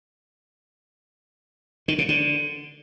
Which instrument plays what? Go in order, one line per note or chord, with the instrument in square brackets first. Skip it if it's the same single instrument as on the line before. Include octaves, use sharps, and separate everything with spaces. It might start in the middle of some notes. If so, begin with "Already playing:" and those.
[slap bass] D#3
C#3
D3